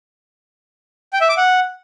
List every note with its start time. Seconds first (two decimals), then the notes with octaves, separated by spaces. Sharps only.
1.13 G5
1.21 E5
1.29 D6
1.37 F#5